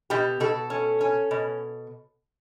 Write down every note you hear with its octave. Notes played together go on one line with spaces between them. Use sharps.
B2 G4
B2 A4
C#4
C#4
B2